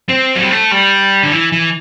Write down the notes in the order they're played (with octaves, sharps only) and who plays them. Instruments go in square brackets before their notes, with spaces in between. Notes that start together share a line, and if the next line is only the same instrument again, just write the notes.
[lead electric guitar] C4
F#3
G3
A3
G3
D3
E3
E3